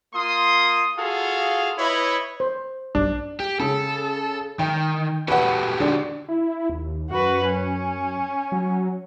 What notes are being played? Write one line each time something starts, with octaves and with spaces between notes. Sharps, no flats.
A#3 F4 C6 D#6
F4 F#4 G#4 A4 F5
E4 B4 C#5 D#5 B5
C5
B1 G2 D4 D6
G4
C#3 A4
D#3 G5
F#4 G4 A4 B4 F#5
D3 D4
E4
D#2
F#2 F#4 B4
C#4
F#3